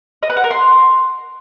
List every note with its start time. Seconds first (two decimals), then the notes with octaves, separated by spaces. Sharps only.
0.23 D#5
0.30 B4
0.37 F#5
0.44 A#4
0.51 C6